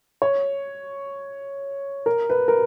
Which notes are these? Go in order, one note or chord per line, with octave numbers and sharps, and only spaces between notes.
C#5
A#4
B4
A#4